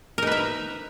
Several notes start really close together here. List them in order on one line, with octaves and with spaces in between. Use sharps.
A#4 D#4 B4 E5